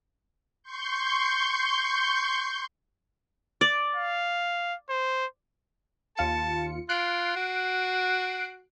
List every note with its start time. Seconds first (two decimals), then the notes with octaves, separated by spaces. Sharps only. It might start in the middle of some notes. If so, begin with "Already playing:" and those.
0.63 C6 C#6 G6
3.61 D5
3.96 F5
4.90 C5
6.17 D#2 F4 A5 C#7
6.89 F4 F#6 C7 D7
7.36 F#4